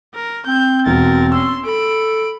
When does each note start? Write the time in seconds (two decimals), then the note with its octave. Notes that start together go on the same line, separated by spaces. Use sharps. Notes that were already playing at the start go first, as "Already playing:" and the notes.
0.14 A#4
0.46 C4 G6
0.86 E1 F#4 A#4 A6
1.32 C#4 C6 E6
1.65 A4 B5 D7